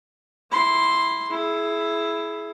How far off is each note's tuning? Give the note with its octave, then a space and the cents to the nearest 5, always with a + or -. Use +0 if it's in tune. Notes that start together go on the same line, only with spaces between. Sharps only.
E4 -5 C6 +0
E4 +5 G#4 +30